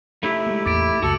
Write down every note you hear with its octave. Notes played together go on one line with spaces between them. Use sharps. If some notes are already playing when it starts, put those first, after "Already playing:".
A3 D#4 E4 G4
G#3 A#3
A1 E2 A#3 D6 A6 D7
C#2 F#2 C#3 F#4 A4